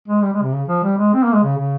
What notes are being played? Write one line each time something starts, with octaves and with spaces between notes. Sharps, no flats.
G#3
G3
G#3
C3
C#3
F3
G3
G#3
C4
A#3
G#3
C#3
C#3